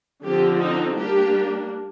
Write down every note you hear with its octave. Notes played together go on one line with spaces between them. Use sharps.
D3 F3 C4 G4
D#4
G3 A#3 D4 G4